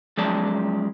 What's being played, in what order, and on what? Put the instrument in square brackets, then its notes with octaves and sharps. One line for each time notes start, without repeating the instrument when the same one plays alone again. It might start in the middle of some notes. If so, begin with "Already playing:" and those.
[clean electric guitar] F3 F#3 G#3 C#4 D5 A5